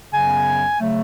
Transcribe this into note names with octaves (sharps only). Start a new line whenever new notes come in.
F#2 C#3 F#3 B3 G#5
C#3 F#3 A3